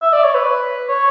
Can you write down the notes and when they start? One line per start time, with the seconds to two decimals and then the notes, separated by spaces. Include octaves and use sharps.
0.02 E5
0.13 D5
0.24 C#5
0.34 B4
0.89 C#5